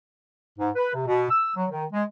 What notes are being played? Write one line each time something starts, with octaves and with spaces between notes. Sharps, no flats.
G#2
B4
C3
B2
E6
F#3
D#3
G#3